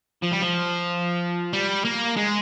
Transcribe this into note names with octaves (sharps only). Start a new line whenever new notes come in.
F3
G3
F3
G3
A#3
G#3